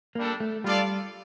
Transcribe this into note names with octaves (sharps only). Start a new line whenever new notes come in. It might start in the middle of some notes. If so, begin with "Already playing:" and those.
G3 A#3 D4 A4
A3
G3 D4 F4 A4 D5 F5